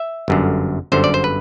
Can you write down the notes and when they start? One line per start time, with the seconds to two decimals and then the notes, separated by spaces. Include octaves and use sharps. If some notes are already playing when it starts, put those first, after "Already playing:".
Already playing: E5
0.28 G1 F#2 D3
0.92 G1 F#2 D3 C5
1.04 D5
1.14 C5
1.24 B4